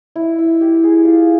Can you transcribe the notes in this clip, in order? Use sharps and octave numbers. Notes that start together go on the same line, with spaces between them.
E4
E4
G4
G#4
F4